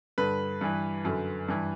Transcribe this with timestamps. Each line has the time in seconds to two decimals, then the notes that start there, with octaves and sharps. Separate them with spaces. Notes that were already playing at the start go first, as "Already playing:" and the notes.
0.18 G2 D3 B4
0.61 G2 E3
1.05 F#2 D3
1.48 G2 E3